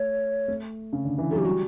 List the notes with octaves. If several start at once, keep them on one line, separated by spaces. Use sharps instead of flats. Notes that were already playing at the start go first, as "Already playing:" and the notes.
Already playing: A3 C#5
A3
C#3
D3
E3
F#3 A4
G4
G3 F#4